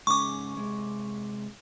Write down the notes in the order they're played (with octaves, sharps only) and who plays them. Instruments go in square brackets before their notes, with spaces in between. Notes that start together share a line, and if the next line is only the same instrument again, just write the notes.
[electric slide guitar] G#2 C#3 C#4 [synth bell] C#6 D6
[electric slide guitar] C3 G#3